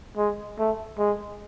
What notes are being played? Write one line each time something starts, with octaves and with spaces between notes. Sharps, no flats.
G#3
A3
G#3